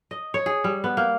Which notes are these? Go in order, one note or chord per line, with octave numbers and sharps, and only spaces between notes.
D#5
C#5
G#4
G3
B3
A#3